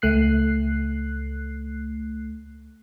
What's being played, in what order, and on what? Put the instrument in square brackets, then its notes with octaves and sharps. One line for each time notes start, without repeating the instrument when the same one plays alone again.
[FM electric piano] C#2 A3 F#6 C7